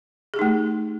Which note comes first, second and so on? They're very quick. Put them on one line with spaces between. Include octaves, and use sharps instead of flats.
G#4 G4 D#4 A3